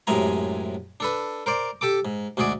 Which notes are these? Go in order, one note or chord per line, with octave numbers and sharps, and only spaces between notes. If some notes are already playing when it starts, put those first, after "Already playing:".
F#2 A2 C3 G#3 G#5 A#5
D4 A4 B4
A#4 C5 D5
G4 A4 A5 D6
G#2
D2 G#2 F#4 G#4 D5